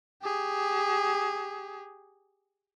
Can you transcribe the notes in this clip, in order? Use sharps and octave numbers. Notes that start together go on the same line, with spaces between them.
G4 G#4